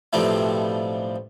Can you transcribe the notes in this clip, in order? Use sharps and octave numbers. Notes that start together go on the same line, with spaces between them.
B1 A2 C3 F3 G3 A3